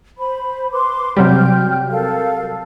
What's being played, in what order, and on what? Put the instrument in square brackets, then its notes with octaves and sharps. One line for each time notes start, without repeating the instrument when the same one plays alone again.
[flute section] C5 B5
B4 C6 D6
[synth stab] C3 F#3 G3 [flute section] G5 F6 G6
[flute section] A4 A#4 F5